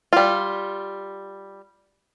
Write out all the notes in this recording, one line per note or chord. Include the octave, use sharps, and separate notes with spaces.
G3 F4